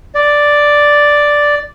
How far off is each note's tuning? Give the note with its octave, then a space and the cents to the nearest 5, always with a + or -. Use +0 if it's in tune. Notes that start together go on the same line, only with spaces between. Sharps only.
D5 +0